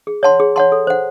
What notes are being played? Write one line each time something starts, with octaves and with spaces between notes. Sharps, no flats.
G#4
C#5 F#5 A5 C6
G#4
C#5 F#5 A5 C6
A4
C5 F#5